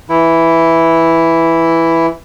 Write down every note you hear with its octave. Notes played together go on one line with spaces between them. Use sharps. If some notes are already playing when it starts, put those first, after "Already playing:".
E3 E4